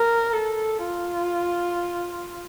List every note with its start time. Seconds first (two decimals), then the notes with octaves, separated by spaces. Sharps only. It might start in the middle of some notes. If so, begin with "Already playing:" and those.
Already playing: A#4
0.33 A4
0.85 F4